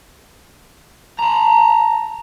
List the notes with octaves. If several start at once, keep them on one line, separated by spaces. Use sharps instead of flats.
A5 A#5